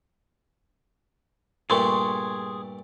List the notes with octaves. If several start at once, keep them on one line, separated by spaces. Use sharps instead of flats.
G2 A#2 A3 G#4 C6 C#6